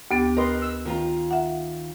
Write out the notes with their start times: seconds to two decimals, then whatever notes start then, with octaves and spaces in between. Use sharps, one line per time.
0.11 D2 B3 G4 A6
0.37 A#4 B4 D#5 C6
0.62 E6
0.85 D#3 F4 A#5
1.31 E5 F#5